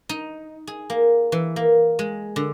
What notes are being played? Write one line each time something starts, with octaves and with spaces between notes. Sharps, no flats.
D#4
G#4
A#3
E3
A#3
G#3
D3